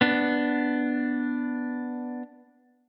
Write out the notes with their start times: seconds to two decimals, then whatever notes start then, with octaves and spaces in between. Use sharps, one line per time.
0.01 B3 D4